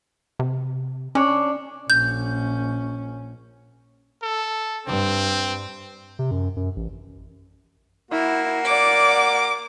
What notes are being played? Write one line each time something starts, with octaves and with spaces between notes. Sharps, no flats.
C3
C#4 D4 C#5
A#1 C#4 G6
A4
G2 C4
C3
F#2
F#2
A1
A#3 E4 F#4
D5 F#5 D6